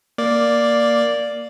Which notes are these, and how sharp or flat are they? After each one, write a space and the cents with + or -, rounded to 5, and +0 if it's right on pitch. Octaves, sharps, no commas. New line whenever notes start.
A#3 +0 D5 +0